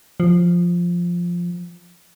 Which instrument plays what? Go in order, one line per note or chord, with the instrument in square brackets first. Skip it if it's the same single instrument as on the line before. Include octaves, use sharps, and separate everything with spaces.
[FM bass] F3